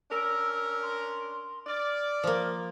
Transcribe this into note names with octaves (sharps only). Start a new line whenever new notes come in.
C#4 D4 A#4 E6
C6
D5 F6
F3 A#3